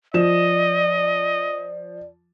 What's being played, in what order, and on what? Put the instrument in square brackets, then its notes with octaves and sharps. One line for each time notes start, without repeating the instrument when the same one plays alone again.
[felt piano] F3 E7 [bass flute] D5 [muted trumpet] D#5